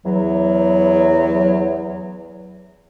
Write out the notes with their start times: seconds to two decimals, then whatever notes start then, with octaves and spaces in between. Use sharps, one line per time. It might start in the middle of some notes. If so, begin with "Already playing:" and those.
0.06 E2 F#3